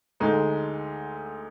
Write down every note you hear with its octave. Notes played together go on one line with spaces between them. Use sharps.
D2 D3 G#3 D#4